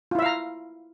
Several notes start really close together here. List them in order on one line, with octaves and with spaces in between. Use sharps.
F4 E4 E5 F5 A#5